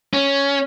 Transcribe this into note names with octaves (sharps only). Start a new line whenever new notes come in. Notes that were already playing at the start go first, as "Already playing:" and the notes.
C#4